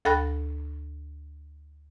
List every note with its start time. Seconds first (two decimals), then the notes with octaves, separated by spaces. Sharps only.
0.05 D2 A4 G5 B5 F#6 A#6